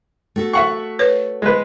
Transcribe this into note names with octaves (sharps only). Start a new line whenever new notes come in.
A3 F#4 A4
E5 F#5 C#6
B4 C#5
G#3 B4